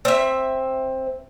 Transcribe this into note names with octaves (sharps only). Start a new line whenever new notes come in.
C4 E5